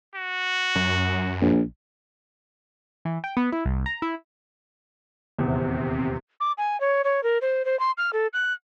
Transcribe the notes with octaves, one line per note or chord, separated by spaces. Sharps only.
F#4
F#2
A#1
E3
G5
B3
E4
C2
A#5
E4
D#1 E2 C3
D6
G#5
C#5
C#5
A#4
C5
C5
C6
F6
A4
F#6